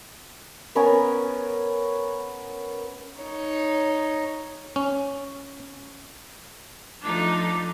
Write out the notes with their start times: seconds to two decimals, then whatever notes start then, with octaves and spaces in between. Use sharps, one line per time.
0.75 B3 C#4 A#4 G#5
3.22 D#4 C#5
4.76 C#4
7.02 F3 A3 D4 D#4 A4